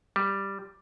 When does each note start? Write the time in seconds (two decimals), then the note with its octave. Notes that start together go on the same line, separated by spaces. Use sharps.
0.16 G3